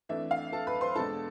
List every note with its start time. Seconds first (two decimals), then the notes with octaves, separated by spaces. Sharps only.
0.09 F2 E3 A3 D4 E5
0.31 F5
0.52 A4 A5
0.67 B4 B5
0.81 C5 C6
0.95 E2 B2 G#3 D4 A4 A5